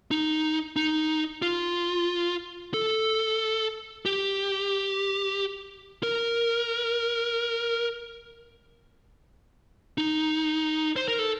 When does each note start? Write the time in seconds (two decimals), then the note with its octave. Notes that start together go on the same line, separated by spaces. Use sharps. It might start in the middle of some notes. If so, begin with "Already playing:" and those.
0.11 D#4
0.76 D#4
1.42 F4
2.74 A4
4.06 G4
6.03 A#4
9.98 D#4
10.96 C5
11.08 A#4
11.19 A4